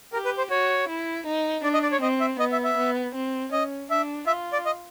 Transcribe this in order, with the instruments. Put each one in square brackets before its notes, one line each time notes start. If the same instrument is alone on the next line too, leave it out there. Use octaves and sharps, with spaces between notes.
[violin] G4 [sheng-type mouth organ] A#4
[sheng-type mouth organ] B4
C5
[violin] F#4 [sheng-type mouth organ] C#5
[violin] E4
D#4
[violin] D4 [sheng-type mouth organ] D5
[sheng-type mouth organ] D#5
D5
C#5
[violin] C4 [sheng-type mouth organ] D#5
[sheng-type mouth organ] E5
[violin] B3 [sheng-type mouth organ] D#5
[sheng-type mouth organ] E5
E5
[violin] B3
C4
[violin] C#4 [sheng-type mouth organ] D#5
[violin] D4 [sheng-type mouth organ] E5
[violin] F4 [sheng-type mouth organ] E5
[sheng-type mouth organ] D5
D#5